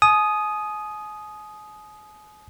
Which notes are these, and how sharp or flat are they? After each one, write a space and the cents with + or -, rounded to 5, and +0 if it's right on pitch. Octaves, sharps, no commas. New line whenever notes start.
G#5 +40 D#6 +0